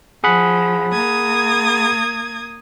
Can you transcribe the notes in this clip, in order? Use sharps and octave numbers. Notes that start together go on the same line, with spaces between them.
F3 G#4 F#5 B5
A#3 D#6 G#6